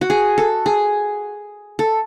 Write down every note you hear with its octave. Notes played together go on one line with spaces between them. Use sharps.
F#4
G#4
A4
G#4
A4